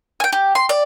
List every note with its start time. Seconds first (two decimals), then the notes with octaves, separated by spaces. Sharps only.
0.20 G5 G#5
0.32 G4
0.55 C6
0.69 D5